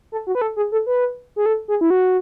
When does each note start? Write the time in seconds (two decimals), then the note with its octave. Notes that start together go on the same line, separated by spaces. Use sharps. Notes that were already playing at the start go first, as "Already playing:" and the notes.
0.12 A4
0.27 F#4
0.35 B4
0.42 A4
0.56 G#4
0.72 A4
0.86 B4
1.36 G#4
1.46 A4
1.68 G#4
1.81 E4
1.90 F#4